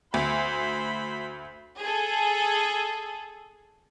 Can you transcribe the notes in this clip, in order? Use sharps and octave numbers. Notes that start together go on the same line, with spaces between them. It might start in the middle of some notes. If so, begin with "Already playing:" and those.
D2 C5 B5
G#4 A4